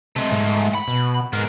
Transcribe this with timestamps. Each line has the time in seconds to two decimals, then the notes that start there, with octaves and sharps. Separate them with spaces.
0.16 C3 G#3 A3
0.32 G#2
0.75 B5
0.88 B2
1.33 G#2 B3 A#4